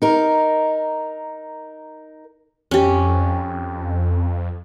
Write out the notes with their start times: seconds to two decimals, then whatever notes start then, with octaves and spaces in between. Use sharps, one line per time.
0.02 D#4 A#4
2.71 F2 C#4 G4